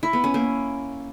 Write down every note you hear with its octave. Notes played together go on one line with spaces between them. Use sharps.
E4
B3
C#4
A#3